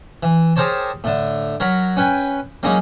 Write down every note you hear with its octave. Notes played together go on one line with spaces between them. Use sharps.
E3
G4 G#4 A#4 C5 C#5 A5
A2 D3
F#3 A#4 C#5 B5
C#4 B4 G5 G#5
F#3 G#3 A#3 C#4 D#4